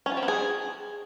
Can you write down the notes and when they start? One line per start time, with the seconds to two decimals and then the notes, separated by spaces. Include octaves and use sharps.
0.06 C#4
0.12 F4
0.17 C4
0.23 B3
0.28 G#4